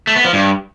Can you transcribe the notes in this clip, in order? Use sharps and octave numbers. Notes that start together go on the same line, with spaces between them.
A3
B3
F3
G2